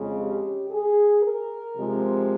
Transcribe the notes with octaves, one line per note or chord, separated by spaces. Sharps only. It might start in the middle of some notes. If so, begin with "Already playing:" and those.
Already playing: F2 C#3 G#3
G4
G#4
A#4
C3 F3 G#3